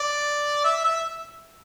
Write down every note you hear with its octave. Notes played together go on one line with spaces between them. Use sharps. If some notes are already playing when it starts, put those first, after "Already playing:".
Already playing: D5
E5
E5